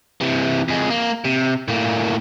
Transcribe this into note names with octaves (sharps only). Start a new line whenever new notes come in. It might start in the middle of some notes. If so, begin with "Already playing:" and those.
C3 E3
F2 G#3
A#3
C3
A2 A#3